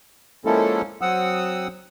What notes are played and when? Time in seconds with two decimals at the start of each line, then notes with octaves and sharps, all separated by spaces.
0.45 F3 G#3 A#3 C#4 E4 A4
1.01 F#3 C4 F#5 D#6 E6